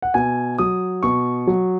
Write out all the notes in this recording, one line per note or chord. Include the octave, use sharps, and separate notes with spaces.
F#5
B2 G#5
F#3 D#6
B2 C#6
F#3